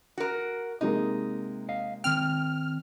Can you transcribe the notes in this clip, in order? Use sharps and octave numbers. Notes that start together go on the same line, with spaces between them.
F#4 A#4
C3 G#3 A#3 D#4
D#5 F5
D#3 C4 G5 F6